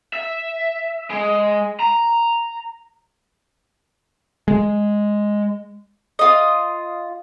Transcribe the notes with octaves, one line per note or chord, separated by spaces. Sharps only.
E5
G#3
A#5
G#3
F4 D#5